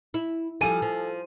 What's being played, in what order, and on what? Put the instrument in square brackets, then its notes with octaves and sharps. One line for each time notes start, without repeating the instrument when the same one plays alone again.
[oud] E4
[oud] F3 G3 [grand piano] A4 G#5 D#7
[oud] F3